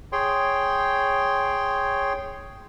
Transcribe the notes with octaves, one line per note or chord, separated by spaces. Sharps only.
G#4 C#5 G5 C6